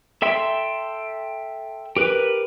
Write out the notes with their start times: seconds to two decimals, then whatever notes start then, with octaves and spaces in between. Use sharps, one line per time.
0.22 A4 E5 G5 C6 E6
1.97 G4 A#4 B4